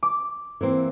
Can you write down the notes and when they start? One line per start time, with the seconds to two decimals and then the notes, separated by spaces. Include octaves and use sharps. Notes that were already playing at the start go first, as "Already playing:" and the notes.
0.03 D6
0.61 E3 A#3 C4